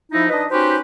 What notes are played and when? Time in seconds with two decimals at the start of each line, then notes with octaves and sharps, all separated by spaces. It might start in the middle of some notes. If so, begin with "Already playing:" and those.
0.12 F3 D#4 E4
0.30 D4 D#4 B4 D#5
0.50 C#4 D#4 F#4 G4 B4 C5